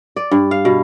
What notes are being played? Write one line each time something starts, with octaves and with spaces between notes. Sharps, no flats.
D5
G2
F5
B2